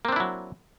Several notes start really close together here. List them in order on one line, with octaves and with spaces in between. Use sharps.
A#3 C4 D4 E4 F#3